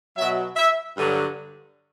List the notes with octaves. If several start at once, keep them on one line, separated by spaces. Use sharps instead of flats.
B2 F#3 E5
E5
G2 D3 F#3